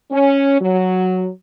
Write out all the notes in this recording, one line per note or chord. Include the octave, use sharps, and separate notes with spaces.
C#4
F#3